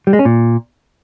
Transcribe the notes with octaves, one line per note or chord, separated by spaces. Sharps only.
G3
G#3
C#4
A#2